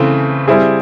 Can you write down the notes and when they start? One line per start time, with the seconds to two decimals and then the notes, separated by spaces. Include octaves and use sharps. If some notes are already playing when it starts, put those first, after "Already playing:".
Already playing: C#3 E3 A3 C4
0.47 G3 C4 E4 G#4